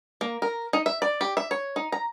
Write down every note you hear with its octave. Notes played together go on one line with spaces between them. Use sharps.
A#3
A#4
D#4
E5
D5
G4
E5
C#5
D#4
A#5